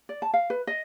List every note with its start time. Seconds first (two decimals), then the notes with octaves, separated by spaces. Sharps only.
0.09 D5
0.22 A5
0.34 F5
0.50 B4
0.67 D#5